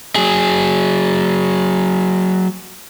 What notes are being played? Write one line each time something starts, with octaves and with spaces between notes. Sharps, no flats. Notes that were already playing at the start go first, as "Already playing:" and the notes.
F#3 G#4